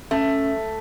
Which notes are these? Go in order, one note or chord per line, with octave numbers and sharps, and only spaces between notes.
A3 C#4